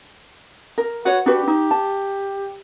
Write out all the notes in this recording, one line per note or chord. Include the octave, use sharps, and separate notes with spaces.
A#4
F#4 B4 C#5
D4 F#4 G4 B4
D#4
A5